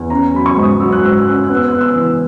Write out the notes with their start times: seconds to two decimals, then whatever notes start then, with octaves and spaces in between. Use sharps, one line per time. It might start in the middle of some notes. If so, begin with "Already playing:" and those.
Already playing: E2
0.10 C#4 A#5
0.35 F#3 B5
0.46 C#6
0.57 G#2
0.62 D#6
0.80 F#3 E6
0.92 F#6
1.03 G#2 E6
1.18 F#6
1.27 C#4 E6
1.44 F#6
1.50 B3
1.56 E6
1.68 B3 F#6
1.81 E6
1.96 E3